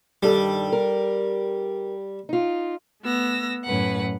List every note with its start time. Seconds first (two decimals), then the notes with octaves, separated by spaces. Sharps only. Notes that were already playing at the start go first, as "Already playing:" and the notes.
0.23 G2 D#3 G3 A4
0.72 A#4
2.29 D#4 F4
3.02 A3 B3 E6 A#6
3.64 F#2 A2 B4 F#5